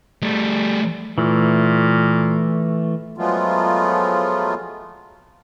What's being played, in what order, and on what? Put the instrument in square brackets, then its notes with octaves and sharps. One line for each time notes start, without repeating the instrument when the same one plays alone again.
[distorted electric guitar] G3 A3
[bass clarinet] A#2 [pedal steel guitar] E3 A3
[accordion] F3 F#3 G#3 A3 B3 F4